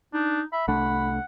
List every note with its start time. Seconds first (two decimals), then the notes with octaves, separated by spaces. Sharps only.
0.14 D4 D#4
0.53 E5 B5
0.68 C2 A3 D4 F#5 B5